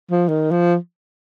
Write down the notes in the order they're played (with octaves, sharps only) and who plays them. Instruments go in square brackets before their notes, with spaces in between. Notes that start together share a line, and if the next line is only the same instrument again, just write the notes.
[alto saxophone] F3
D#3
F3